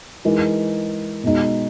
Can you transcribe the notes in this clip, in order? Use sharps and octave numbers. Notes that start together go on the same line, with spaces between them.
E3 G#3 D#4 A#4
B2 G#3 D#4